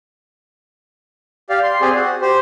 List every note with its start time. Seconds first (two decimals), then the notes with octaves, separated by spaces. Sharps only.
1.50 G4 D5 F5
1.63 C6
1.81 C4 G4 G#4 D5
1.95 F#4
2.22 G4 C5